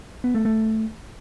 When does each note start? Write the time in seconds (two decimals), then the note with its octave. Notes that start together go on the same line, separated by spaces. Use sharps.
0.24 B3
0.35 A3
0.45 A3